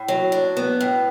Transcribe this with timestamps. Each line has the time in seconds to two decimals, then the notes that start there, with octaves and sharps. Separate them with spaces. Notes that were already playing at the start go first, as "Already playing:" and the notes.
Already playing: A2
0.08 F#3
0.32 D4
0.57 B3
0.81 A2